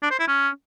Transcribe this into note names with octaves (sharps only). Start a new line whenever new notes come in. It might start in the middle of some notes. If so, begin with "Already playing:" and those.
D4
C5
E4
C#4